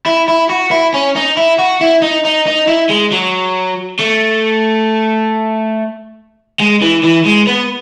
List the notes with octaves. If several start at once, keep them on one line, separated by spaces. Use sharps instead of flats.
E4
E4
F#4
E4
C#4
D#4
E4
F#4
E4
D#4
D#4
D#4
E4
G#3
F#3
A3
G#3
E3
E3
G#3
B3